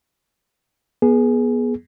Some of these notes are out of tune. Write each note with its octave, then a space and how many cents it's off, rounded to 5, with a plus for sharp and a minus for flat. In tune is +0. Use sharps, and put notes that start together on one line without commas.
B3 -25 G#4 +10